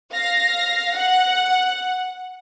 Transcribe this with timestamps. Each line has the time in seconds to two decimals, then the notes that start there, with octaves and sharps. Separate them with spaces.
0.12 F5 A#6
0.96 F#5